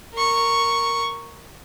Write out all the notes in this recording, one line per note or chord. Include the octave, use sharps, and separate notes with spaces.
A#4 C#6